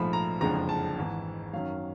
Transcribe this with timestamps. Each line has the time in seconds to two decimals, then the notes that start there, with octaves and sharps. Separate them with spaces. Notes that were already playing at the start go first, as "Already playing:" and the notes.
Already playing: A#1 G#2 F3 A3 B5
0.13 A#5
0.41 F#1 F2 D3 F3 G#3 A#5
0.69 A5
0.97 G#1 G#2 E3
1.53 F#2 D#3 F#3 F5